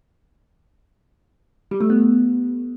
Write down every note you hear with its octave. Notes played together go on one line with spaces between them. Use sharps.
G3
A3
B3